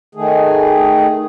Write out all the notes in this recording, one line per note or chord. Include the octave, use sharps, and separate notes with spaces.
D#3 A3 G#4